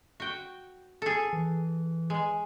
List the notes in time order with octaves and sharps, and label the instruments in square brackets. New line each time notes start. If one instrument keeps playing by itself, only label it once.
[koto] F#4 G5
G#4 A4
[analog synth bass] E3
[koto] G#3